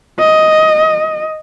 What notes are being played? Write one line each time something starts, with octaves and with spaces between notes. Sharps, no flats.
D#5